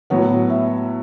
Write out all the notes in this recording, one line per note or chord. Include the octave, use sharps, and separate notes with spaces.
A2 F#3 B3 C#5
E5